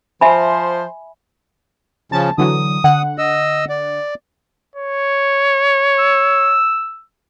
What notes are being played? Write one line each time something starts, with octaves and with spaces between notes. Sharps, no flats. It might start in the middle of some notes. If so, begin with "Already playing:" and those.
F3 C5 E5 G#5 B5
C#3 F3 C#4 A5
D3 E3 F#3 D#6
D3 F#5
D#5 E6
D5
C#5
E6